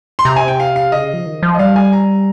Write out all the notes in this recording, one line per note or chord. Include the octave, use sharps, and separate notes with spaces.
C6
C3 A#5
G#5
G5
F5
F5
C#3 D#5
F3
D#3
F3
D#5
G3 F5
G#5
A#5